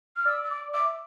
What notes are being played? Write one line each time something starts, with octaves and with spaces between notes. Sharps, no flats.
F6
D5 E6
E6
D6
E5 D6